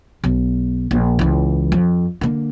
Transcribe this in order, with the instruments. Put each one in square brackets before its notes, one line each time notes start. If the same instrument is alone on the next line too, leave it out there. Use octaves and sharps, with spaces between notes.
[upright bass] B1
A#1
C#2 E3
F2
D3 A#3